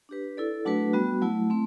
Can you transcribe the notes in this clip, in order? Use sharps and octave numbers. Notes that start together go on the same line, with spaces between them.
D4 G4 B4
E4 A4 D5
F#3 A3 D4 F#4 B4
G3 B3 F#4
F#3 A3 E4
A3 C4